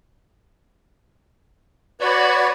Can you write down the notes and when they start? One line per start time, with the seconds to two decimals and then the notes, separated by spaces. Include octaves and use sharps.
2.01 F#4 B4 C#5 D5